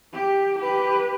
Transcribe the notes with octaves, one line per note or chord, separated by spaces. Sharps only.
G4
G4 B4